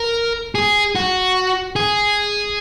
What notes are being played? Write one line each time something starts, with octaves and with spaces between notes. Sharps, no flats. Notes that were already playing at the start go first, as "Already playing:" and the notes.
Already playing: A#4
G#4
F#4
G#4